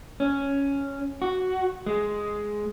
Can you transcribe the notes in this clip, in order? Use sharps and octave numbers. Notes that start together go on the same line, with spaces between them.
C#4
F#4
G#3